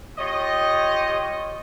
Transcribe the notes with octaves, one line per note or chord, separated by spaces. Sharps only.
F4 G4 C#5 D#5